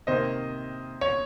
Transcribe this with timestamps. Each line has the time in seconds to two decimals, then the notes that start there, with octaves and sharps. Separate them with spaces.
0.07 C3 D#3 A#3 C5 D#5
1.01 C#5